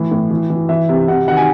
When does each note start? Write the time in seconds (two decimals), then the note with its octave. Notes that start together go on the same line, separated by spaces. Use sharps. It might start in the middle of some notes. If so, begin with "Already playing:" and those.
Already playing: A2 E3
0.12 A2
0.31 E3
0.50 E3
0.69 E3 E5
0.89 C3
1.07 C3 F#5
1.27 D#3 F#5
1.37 G#5